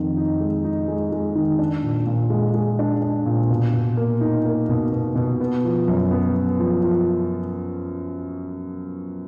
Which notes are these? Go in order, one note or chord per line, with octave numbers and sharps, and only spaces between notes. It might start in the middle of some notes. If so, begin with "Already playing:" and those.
Already playing: F2 D#3
D#4
G#3
D#4
G#3
G#3
D#3
D4
A#2
A#2
G#3
G#3
D4
D4
A#2
B2
B2
A#3
D#4
A#3
B2
B2
B2
B3
F3
F#2
B3
B3
F3
F3